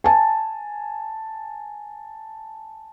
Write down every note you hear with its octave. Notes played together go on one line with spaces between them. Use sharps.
G#5 A5